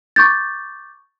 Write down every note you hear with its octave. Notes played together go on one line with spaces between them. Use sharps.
C#6 D6 G6 A6